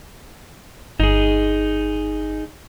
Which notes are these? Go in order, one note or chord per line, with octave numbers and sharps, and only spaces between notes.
G1 D#4 G#4